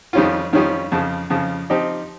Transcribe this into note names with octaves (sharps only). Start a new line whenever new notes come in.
F2 D#3 G3 C#4 F4
F2 D#3 G3 C#4 F4
F2 C#3 F3
F2 C#3 F3
F3 C4 D#4 G4